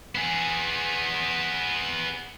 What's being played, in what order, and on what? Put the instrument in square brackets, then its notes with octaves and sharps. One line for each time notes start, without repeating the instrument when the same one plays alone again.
[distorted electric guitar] B3 G#4